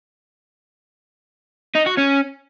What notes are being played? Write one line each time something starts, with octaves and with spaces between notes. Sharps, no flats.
D#4
F#4
C#4